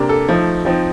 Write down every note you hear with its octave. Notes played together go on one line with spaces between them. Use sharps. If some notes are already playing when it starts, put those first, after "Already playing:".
Already playing: C3 A#3 D4
A4
F3 A3 D#4
F3 C4 D#4